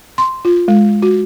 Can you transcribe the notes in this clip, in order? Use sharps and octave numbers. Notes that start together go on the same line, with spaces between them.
C6
F4
G#3
F#4